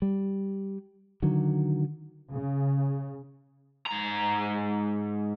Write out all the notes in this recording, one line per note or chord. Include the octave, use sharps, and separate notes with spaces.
G3
D3 D#3 F#3
C#3
G#2 A#5